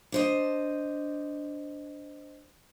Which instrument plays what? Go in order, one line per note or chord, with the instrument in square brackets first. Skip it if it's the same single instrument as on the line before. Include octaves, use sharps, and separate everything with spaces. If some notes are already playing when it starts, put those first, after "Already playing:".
[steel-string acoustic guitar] D4 C5 D#5